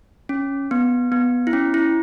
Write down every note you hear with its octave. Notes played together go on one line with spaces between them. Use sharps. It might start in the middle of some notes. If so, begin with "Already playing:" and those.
C#4
B3
B3
E4
C#4
E4